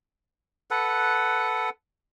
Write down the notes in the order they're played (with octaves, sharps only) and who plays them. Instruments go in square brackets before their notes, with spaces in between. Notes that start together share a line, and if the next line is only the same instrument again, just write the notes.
[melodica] A4 B4 F#5